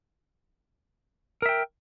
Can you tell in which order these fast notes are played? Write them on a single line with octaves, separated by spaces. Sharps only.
A#4 E5 G5